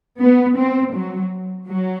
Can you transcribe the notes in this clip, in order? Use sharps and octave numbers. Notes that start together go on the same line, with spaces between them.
B3
C4
F#3
F#3